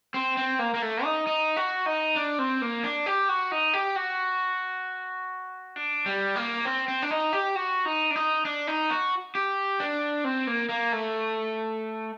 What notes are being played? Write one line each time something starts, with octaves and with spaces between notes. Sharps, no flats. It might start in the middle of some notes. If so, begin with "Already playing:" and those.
C4
C4
A#3
A#3
A3
D#4
D#4
F#4
D#4
D4
C4
A#3
D4
G4
F#4
D#4
G4
F#4
D4
G3
A#3
C4
C4
D4
D#4
G4
F#4
D#4
D4
D#4
D4
D#4
F#4
G4
D4
C4
A#3
A#3
A3